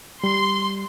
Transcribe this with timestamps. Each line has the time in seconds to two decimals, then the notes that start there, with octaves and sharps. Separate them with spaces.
0.24 G3 C6